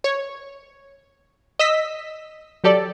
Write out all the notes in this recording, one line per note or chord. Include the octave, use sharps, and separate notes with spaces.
C#5
D#5 E6 B6
F#3 G4 A4 D5